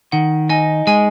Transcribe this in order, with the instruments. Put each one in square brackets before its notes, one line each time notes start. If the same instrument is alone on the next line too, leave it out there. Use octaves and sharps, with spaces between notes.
[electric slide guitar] D#3 [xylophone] F#5
[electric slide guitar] D#4 [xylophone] D#5 G#5
[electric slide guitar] G#3 [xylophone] D#5 G#5